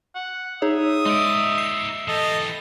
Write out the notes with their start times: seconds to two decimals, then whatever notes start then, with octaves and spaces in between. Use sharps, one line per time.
0.15 F#5
0.62 D#4 G#4 C#5 E5 D#6
1.06 G#3 D#4 D5
1.58 C7
2.08 E3 G4 A4 D#5